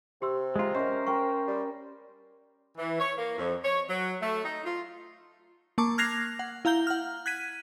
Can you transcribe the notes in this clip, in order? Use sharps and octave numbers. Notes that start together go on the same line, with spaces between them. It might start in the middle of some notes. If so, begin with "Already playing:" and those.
C3 G4 C6 E6
G#3 F4 E5 A#5
C#4 A#4 C5 D#5 C6
A#4 G5 A#5 C6 C#6
G3
E3
C#5
A#3
F2
C#5
F#3
A3
D#4
F4
A#3 A5 C#6 D6
F6 F#6 G#6 A#6 C7 F7
F#5
E4 F5 A#5 G6 G7
F#5 F6
F#6 G#6 B6 D#7